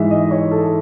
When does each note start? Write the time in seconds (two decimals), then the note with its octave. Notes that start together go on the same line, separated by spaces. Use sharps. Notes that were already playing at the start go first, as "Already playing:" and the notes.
Already playing: G#2 E3 G#3 E5
0.10 D#5
0.31 C#5
0.51 A4